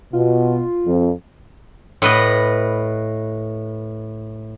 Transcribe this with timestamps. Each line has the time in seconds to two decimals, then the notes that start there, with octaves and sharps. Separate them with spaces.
0.13 B2 F4
0.86 F2
2.02 A2 B4 D#5